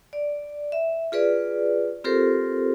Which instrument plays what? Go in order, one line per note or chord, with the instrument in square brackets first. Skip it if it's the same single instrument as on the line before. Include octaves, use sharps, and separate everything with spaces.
[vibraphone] D5
E5
F4 G#4 B4 D5
C4 F4 G4 A4 A#4 C5